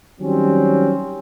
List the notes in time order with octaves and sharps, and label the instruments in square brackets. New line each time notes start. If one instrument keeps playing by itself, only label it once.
[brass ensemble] D#3 F#3 G3 C4 C#4